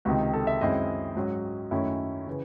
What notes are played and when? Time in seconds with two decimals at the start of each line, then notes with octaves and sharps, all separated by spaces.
0.05 C#2 C3 D#3 F#4
0.33 A4
0.47 E5
0.61 F#2 D#3 G#3 C4 E4 D#5
1.15 G#2 F#3 C#4
1.71 F#2 D#3 A3 C#4 E4
2.27 C#3 E3